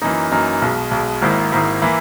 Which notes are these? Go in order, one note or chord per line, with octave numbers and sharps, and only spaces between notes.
F#2 E3 A#3 D#4
F#2 E3 A#3 D#4
B1 B2 G#3
B1 B2 G#3
G#1 G#2 D#3 A#3 E4
G#1 G#2 D#3 A#3 E4
E3 A#3 E4